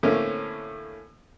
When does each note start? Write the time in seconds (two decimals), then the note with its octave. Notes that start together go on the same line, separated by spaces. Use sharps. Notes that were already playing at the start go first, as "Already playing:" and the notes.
0.03 A2 D3 A#3 C4 C#4 E4